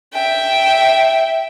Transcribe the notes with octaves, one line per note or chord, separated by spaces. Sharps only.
E5 G5